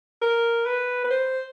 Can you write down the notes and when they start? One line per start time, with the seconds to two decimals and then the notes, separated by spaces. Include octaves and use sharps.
0.22 A#4
0.66 B4
1.04 B4
1.10 C5